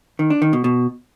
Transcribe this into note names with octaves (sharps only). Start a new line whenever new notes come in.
D#3
D4
D#3
B2
B2